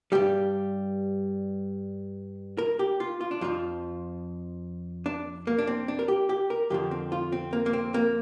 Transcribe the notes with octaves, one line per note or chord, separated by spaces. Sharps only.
G2 G3 G4
A#4
G4
F4
F4
D4
F2 F3 F4
D4
A#3
D4
C4
D4
A#4
G4
G4
A#4
F2 D3 F3 G4
C4
F4
C4
A#3
A#3
C4
A#3